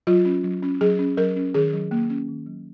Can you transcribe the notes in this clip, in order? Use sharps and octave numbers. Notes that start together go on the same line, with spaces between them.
F#3 F4
C#4
F#3
C#4
F#3 G#4
C#4
F#3 A#4
C#4
D#3 G#4
F#3
A#3
C#4
D#3
F#3